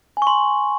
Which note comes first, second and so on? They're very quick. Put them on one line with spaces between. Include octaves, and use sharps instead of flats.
G#5 C#6 C6